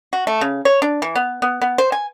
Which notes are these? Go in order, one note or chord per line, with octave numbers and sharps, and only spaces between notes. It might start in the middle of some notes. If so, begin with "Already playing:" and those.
F#4
A3
C#3
C#5
D4
E3
B3
B3
B3
C5
G#5